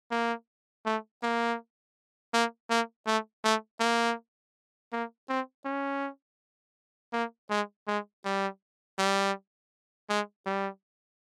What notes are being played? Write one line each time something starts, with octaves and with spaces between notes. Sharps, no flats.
A#3
A3
A#3
A#3
A#3
A3
A3
A#3
A#3
C4
C#4
A#3
G#3
G#3
G3
G3
G#3
G3